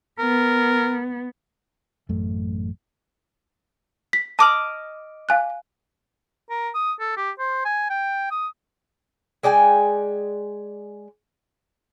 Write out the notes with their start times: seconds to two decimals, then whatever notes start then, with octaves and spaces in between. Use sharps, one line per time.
0.19 B3 A#4
2.09 A1 F#2 A3
4.13 B6
4.39 D#5 A5 D6 F6 F#7
5.29 F5 G#5 F#6
6.50 A#4
6.75 D#6
7.00 A4
7.17 G4
7.39 C5
7.65 G#5
7.90 G5
8.31 D#6
9.43 G#3 D5 G5 G#5